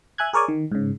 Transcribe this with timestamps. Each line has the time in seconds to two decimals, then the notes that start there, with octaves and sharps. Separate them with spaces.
0.18 E5 G#5 F#6 G#6
0.33 G#4 A#4 C#5 D5 G#5
0.48 D#3
0.72 G#2 C#3